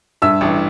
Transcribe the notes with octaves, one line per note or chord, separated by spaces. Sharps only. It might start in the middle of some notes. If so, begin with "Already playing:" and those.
G2 E5 E6
A1